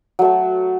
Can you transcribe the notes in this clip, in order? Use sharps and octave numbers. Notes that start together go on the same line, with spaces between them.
F#3 A3 A4